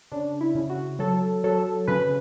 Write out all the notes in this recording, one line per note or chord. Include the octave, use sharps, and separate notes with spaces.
C#3 D4
E4
C#3
F#4
F#3 A4
F#3 A4
C#3 B4